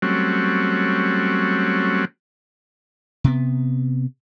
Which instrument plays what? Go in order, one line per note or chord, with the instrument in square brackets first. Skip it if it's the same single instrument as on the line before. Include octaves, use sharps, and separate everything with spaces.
[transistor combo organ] F#3 G3 A3 C4 C#4 F#4
[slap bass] C3 B3